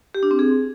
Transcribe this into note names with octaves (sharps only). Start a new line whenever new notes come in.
G4
D4
C4
G#4